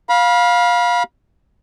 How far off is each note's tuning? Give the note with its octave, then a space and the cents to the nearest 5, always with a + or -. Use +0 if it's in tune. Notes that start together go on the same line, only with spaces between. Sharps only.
F5 +15 B5 -30